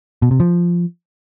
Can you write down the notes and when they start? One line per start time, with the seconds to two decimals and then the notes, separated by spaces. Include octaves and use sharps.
0.22 B2
0.31 C3
0.40 F3